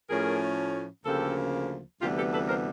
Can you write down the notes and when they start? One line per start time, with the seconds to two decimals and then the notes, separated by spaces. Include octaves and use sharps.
0.09 A2 F3 A3 C#4 G#4 A#4
1.05 D2 C#3 F3 A#3 G4 A4
2.01 D2 C3 E3 G3 B3 F4 G4
2.17 G4 A4
2.33 A4 B4
2.49 A#4 C5